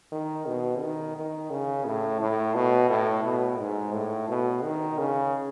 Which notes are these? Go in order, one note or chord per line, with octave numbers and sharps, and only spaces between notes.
D#3
B2
D#3
D#3
C#3
A2
A2
B2
A2
B2
G#2
A2
B2
D#3
C#3